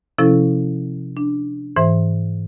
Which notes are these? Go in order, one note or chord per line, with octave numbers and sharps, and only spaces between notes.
C3 F3 C#4 E4 A4
D4
G#2 E3 C5 E5